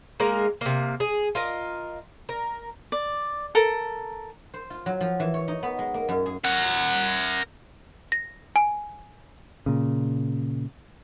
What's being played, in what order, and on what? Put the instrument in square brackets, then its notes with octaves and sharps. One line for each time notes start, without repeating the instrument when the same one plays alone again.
[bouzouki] G#3 A#3 D#4 A#4
C3 A#3
G#4
F4 A#4 D#5
A#4
[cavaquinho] D5
A4 A#4 A#5
[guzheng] C5
F4
F#3
F3
E3
C#5
D#4
B3
G#3
A#3
F#2
G#4
[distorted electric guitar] A#4 F#5
[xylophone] A#6
G#5
[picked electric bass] A#2 C#3